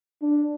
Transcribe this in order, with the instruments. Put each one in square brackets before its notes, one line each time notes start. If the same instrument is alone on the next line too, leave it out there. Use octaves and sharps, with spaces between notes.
[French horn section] D4